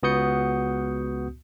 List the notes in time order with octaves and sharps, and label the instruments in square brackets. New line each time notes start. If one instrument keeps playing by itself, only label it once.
[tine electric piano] C#2 B3 F#4 D#6 G6 C#7